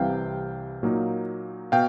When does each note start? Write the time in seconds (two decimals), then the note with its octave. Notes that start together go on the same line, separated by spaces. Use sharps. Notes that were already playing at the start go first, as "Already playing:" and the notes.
Already playing: C2 C3 E3 G3 F5 G5
0.83 A#2 F#3 A#3 D#4
1.72 B2 F5 G5